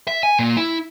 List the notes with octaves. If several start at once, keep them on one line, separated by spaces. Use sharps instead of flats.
E5
G#5
A#2
E4